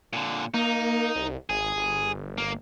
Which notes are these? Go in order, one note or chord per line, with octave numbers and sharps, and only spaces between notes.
A#2 D3
A#3 D#4
C2
G#1 G#4
G1
A#3